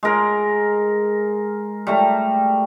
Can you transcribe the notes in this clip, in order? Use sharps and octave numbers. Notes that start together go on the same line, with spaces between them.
G#3 A#4
G3 A3 A#5